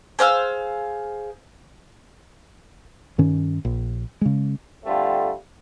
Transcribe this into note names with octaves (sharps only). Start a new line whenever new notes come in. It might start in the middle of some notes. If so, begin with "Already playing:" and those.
G#4 C5 F5 E6
G2 D#3 C#4
A#1
C#3 G#3
D3 G3 A3 C4 F4